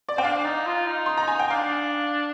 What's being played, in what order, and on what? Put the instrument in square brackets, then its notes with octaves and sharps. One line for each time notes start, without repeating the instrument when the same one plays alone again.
[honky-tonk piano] D5
[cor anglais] C4 [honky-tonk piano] G5
[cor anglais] D4 [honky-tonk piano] F5
[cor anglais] D#4
F4
D#4
[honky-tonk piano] C6
A#5
G#5
G5
[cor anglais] D4 [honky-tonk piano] F5